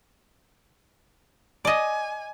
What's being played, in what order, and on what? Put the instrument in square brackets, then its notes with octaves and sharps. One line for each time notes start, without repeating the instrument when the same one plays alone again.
[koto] D5 D#5 [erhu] G#5